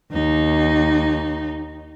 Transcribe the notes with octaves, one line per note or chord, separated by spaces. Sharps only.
D#2 D#4